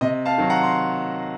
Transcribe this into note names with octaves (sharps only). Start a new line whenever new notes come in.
C3 D#5
F5 A5
D#3 F#3
F#5 A#5
C6